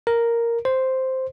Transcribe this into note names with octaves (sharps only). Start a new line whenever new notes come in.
A#4
C5